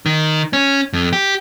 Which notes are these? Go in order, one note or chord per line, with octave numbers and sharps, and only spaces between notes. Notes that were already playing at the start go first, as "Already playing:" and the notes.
D#3
C#4
F2
G4